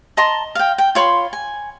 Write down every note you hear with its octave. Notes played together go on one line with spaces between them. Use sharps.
D#5 A5 A#5 C6
F5 G5
G5
F4 C#5 B5 C6
G#5